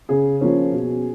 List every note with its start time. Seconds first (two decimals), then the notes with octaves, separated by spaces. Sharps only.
0.09 C#3 G#4
0.41 F3 A#3 C#4
0.72 B2